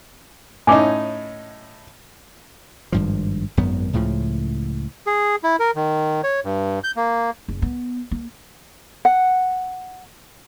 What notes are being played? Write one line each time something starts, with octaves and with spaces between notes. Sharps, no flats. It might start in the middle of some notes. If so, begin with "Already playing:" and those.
A2 C#4 D#4 G#5 D6
G#1 G2 F3
G#1 F#2 D#3 B3
C#2 A2 C#3 F3
G#4
E4
A#4
D#3
C#5
G2
G6
A#3
F#1
B3
A#3
F#5